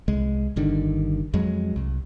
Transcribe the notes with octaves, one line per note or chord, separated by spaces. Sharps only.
C2 G#3
G1 G2 D3 D#3
F2 F#3 G#3
C2